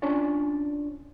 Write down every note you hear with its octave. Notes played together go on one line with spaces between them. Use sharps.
C#4 D4 F4 C#5 D5